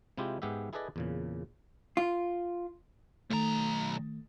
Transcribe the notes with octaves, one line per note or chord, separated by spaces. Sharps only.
C3 G#3 E4 F4 G4
G#2 B3 G4 G#4 E5
E4 G#4 A4 B4 D5 D#5
E2 A#2 C#3
F4
B1 D#3 A3 A#5